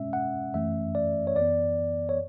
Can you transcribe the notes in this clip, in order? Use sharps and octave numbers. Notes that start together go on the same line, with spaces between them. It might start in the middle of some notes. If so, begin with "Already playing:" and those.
Already playing: B2 G#3 C#4 E5
F#5
F#2 E3 A3 C#4 E5
D5
C#5
F#2 E3 B3 D5
C#5